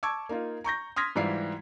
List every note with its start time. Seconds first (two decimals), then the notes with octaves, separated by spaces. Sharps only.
0.03 A5 C#6 D6 E6 G#6
0.29 A#3 D#4 F4
0.64 A#5 C#6 G6 A#6
0.96 C6 D#6 F6 G#6 A#6 B6
1.16 G#2 E3 G3 E4 F4 C7